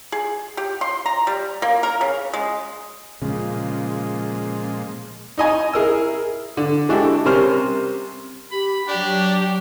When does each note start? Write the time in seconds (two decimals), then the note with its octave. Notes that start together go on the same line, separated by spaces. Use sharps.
0.12 G#4
0.57 G4
0.81 C6
1.06 A#5
1.27 G3
1.62 A#3
1.83 A#4
2.01 C#3
2.34 G#3
3.22 A#2 C#3 F3 G#3
5.38 D#4 D#5 G#5
5.73 E4 G#4 A#4 E6
6.57 D3
6.89 G#3 D4 E4 F#4 G4 A4
7.25 C3 G3 C#4 A#4 C5 F6
8.52 G4 B5
8.88 F#3 D4 G4 D5